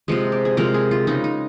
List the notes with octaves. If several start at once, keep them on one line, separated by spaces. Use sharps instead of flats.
C3 F3 G#3
G4
G#4
C3 F3 G#3 A#4
G#4
F4
C#3 G#3 D#4
D#4